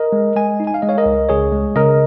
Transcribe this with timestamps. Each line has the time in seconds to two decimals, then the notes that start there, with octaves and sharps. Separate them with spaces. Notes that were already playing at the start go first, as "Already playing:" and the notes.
Already playing: A#4 D#5
0.13 G#3
0.36 G#3 D#5 G#5
0.60 D#4
0.67 G#5
0.74 F5
0.82 G#3 D#5
0.89 C#5 F5
0.98 A#4 D#5
1.06 C#2
1.29 C#2 G#4 C#5
1.52 G#3
1.76 C#3 A#4 D#5